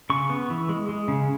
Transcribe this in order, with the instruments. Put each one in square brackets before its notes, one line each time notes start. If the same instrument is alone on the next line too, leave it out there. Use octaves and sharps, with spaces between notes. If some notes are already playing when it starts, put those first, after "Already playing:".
[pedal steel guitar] C#3 C#6
B3
E3
G#3
G#3
C#3